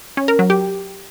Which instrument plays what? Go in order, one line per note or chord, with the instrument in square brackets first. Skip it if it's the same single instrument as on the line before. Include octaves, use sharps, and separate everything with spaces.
[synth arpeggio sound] C#4
A#4
F#3
G4